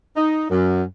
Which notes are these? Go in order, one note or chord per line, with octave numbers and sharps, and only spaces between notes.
D#4
F#2